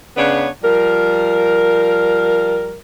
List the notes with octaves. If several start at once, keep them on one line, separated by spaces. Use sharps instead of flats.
C#3 B3 D4 B4 C#5
F3 G3 A#4